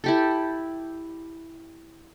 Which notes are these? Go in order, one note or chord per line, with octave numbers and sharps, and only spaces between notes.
E4 G4 A4